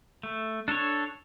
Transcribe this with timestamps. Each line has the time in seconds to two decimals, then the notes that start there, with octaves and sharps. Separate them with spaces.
0.23 A3
0.68 D4 A4 C#5